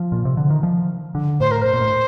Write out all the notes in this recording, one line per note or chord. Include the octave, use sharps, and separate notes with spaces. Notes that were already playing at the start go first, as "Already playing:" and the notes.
Already playing: F3
A#2
C3
D3
D#3
F3
D3
A2 C5
A#4
A2 C5
A#2
A2